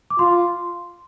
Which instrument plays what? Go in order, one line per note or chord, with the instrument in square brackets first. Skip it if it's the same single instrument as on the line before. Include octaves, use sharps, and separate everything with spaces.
[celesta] D6
[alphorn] F4 [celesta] C6